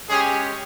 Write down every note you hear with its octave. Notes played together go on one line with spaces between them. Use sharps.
G#3 C#4 G4 G#4